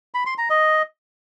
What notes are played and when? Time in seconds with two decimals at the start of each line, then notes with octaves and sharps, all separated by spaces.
0.14 B5
0.26 C6
0.38 A#5
0.50 D#5